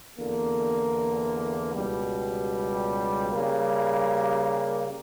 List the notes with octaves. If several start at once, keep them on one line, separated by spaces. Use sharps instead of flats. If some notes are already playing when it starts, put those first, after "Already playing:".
E2 D3 A#3
C#2 B2 G3
C#3 G3 A#3